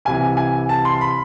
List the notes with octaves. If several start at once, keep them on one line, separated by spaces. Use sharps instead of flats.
C2 C3 E3 G#5
G#5
A5
C6
B5